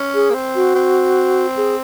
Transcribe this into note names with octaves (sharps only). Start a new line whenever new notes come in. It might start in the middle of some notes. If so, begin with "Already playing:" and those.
Already playing: C#4
G#4
A#3
C4
F#4
C4
G#4